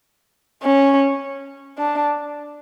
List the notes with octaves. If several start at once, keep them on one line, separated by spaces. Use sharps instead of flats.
C#4
D4